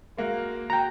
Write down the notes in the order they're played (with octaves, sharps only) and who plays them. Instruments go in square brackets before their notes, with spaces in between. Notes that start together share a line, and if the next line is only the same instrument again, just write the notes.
[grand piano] G#3 A#3 F#4
[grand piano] F#4 [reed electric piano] G5 A#5